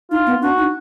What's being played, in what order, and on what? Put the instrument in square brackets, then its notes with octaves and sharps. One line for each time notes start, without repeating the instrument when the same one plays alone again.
[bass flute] D#4 [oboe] F4
[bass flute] B3
[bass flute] D4 [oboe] F#4
[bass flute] D#4